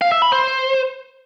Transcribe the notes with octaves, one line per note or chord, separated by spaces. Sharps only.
F5
E5
B5
C5